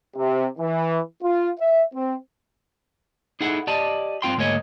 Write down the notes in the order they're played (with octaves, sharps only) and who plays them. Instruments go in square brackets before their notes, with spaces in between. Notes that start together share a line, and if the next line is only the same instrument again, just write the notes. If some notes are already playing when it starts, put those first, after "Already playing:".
[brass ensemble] C3
E3
F4
E5
C4
[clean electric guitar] D#4 E4 G#4 A4 F#5
G4 D5 D#5 A5
G2 C4 F4 G5 C6
D2 G#2 A#3 G#4 C#5 D#5